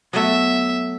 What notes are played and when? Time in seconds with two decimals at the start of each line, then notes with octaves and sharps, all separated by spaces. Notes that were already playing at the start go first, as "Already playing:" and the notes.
0.13 F#3 A3 B3 E5